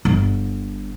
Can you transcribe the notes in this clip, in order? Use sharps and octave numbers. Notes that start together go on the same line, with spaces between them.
G1